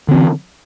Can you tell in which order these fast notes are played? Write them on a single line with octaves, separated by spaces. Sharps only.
D3 C4 E3